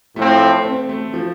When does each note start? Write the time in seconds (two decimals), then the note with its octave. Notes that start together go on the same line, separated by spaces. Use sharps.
0.16 A2 F3 A3 C4
0.65 C4
0.89 A3
1.14 F3